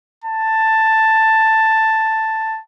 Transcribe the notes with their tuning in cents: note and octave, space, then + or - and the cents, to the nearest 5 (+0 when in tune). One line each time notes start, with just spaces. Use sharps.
A5 +5